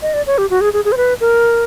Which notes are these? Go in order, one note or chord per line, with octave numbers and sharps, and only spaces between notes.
D#5
D5
C#5
G4
F#4
G#4
G#4
G#4
C5
B4
A#4